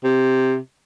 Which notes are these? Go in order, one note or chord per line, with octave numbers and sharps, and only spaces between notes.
C3